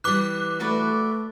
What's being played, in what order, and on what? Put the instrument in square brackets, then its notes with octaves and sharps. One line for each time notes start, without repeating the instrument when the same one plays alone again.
[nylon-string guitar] E3 G3 [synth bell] D6 F#6
[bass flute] A3 [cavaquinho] F#4 B4 D5